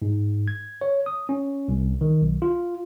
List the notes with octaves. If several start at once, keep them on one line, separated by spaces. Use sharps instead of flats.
G#2
G#6
C#5
D#6
C#4
C2
D#3
B1
F4